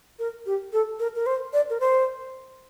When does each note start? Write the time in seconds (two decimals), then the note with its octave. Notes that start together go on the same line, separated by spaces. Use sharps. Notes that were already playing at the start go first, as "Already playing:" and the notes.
0.19 A#4
0.46 G4
0.73 A4
1.00 A#4
1.15 A#4
1.26 C5
1.53 D5
1.70 A#4
1.80 C5